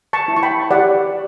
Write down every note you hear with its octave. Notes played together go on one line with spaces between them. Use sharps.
A5 C#6
E4
C#6
G5 B5
G4 D5 F#5